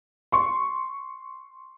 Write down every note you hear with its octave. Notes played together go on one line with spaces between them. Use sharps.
C6 C#6